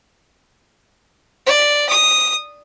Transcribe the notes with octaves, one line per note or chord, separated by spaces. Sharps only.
D5
D#6